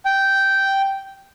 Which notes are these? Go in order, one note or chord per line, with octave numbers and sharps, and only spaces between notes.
G5